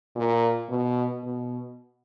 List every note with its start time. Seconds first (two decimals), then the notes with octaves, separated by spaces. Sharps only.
0.16 A#2
0.69 B2
1.23 B2